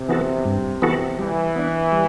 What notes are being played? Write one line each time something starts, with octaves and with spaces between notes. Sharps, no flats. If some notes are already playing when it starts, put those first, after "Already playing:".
Already playing: C3
E3 B3 F#4 A4
G2
E3 B3 F#4 A4
E3 G3
B3 D4
G3